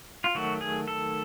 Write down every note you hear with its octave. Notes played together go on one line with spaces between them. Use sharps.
F4
D#3 F#3 A3 F#4
G#4
A4